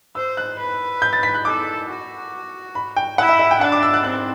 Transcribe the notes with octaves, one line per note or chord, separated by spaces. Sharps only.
C5 E6
F#6
B4
G6
A6
B6
F#6
A4 D6
F#4
B5
G5
E4 F#5
E5
E5
G5
D4 F#5
D6
E6
F#6
C4 F#6